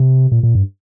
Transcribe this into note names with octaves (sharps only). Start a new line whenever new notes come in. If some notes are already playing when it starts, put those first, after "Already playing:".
Already playing: C3
A#2
A#2
G2